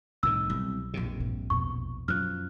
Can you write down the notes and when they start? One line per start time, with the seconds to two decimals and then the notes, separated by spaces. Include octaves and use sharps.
0.23 C2 A2 D#3 E6
0.50 C2 B2 F#3
0.94 A#1 F2 C3
1.20 G2 A#2
1.50 E2 B2 C#6
2.08 F#2 F3 F6 F#6